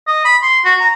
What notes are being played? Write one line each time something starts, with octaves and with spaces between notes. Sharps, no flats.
D#5
B5
C6
F#4
A#5